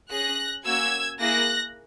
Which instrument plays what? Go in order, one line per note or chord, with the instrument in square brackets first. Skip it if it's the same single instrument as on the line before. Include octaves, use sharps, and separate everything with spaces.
[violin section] C#4 G#4 F#6 A#6
A#3 C#4 F#4 E6 G#6
A#3 E4 G#4 F#6 A#6